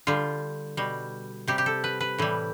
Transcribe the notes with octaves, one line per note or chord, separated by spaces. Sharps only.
D3 G3 F4
B2 G3
C3 G3 G4
G4
A4
B4
B4
A2 E3 G3